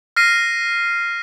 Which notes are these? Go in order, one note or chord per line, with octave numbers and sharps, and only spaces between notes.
F6 A#6 C7 D#7